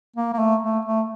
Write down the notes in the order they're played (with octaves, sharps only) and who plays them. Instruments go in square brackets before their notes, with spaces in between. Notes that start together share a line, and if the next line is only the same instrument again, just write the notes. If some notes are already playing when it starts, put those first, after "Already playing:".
[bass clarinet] A#3
A#3
A3
A3
A3